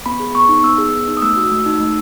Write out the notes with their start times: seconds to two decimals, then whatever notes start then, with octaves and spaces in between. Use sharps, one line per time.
0.06 B3 B5
0.20 G#4
0.35 B3 C#6
0.49 D#4
0.64 B3 E6
0.78 G#4
0.93 B3
1.08 D#4
1.17 D#6
1.22 A3 E6
1.37 F#4
1.52 A3
1.66 D#4
1.80 A3